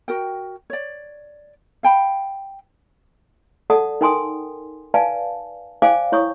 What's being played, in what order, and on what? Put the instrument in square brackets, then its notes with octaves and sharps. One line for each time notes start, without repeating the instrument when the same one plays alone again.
[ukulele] F#4 A#4 G5
C#5 D5
F5 G5 B5
[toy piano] A4 D5 F#5 A5 D#6
D#4 A#4 G5 G#5 C6 D#6
B4 D5 F5 G#5 A5
C5 D5 F5 G5 G#5 D6
E4 C#5 C#6 D#6